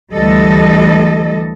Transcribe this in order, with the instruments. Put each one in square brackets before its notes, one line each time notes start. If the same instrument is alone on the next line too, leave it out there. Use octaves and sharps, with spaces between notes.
[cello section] D2 E3 G3 A4 D#5